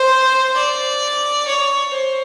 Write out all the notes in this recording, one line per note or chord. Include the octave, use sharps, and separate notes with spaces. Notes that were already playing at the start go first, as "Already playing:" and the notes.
Already playing: C5
D5
C#5
C5